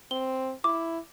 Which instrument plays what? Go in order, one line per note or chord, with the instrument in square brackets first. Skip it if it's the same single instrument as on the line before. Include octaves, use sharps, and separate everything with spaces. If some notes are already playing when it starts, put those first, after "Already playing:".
[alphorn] C4 [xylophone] G7
[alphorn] E4 [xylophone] D6